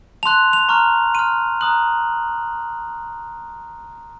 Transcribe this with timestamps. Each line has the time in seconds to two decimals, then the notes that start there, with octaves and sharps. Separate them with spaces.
0.23 A5 C6 F#6 F7
0.53 F7
0.68 A#5 C#6 F6
1.15 C6 F6 D#7
1.61 A#5 D#6 F#6 F#7